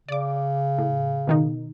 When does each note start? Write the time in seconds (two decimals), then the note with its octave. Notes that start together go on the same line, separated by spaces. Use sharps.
0.09 C#3 D5 D6
0.78 A2
1.27 B2 D#3 D#4